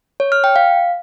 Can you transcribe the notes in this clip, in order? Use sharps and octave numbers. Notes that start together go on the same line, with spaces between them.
C#5
F6
G5
F5